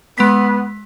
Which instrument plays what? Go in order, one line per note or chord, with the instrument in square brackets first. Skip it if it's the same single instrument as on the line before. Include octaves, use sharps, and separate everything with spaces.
[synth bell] G#3 B6 [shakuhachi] B3